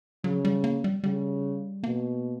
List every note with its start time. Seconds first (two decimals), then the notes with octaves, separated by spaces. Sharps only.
0.24 C#3 F#3
0.45 G3
0.64 A#3
0.84 G3
1.04 C#3 G3
1.83 B2 A#3